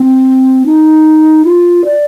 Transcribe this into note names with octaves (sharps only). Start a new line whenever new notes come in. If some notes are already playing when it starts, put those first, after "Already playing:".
Already playing: C4
D#4
F4
D5